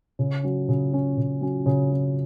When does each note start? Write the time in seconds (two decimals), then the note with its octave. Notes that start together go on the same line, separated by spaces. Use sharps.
0.19 C#3
0.43 F#3 C#4
0.69 C#3
0.93 F#3 C#4
1.17 C#3
1.41 F#3 C#4
1.66 C#3
1.91 F#3 C#4